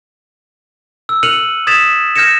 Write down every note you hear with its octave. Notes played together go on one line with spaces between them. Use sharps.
E6
F6 F#6 C#7 D#7 F7 F#7
D#6 G#6 A6 B6 E7 F7
F6 G6 G#6 A#6 C#7 E7